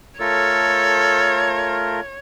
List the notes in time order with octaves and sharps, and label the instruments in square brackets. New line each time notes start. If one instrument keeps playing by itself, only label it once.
[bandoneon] A3 F4 A#4 [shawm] A4 [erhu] C#5